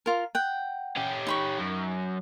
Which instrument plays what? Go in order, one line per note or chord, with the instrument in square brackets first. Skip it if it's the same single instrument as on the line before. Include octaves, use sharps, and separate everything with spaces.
[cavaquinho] F4 A#4
F#5 G5
[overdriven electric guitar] C#4 G4
[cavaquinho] D#4 B5 C#6
[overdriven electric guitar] F#2